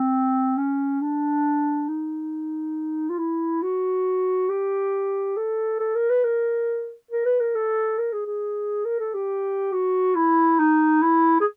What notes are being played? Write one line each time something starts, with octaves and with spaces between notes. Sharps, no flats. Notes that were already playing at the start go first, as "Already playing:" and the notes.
Already playing: C4
C#4
D4
D#4
F4
E4
F#4
G4
A4
A4
A#4
B4
A#4
A#4
B4
A#4
A4
A#4
G#4
G#4
A#4
A4
G4
F#4
E4
D#4
E4
G#4